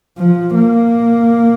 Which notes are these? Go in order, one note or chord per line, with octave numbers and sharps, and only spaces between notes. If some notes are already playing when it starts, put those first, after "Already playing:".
F3
A#3